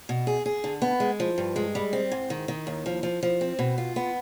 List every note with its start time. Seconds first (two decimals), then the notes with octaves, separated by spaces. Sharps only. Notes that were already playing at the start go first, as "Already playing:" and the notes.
0.09 B2
0.27 G#4
0.46 G#4
0.64 D3
0.82 B3
1.00 G#3
1.20 F3
1.38 G2
1.56 G#3
1.75 G3
1.93 C4
2.12 G#2
2.30 D#3
2.48 D#3
2.67 D#2
2.86 F3
3.03 F3
3.23 F3
3.41 C4
3.59 B2
3.78 F4
3.96 B3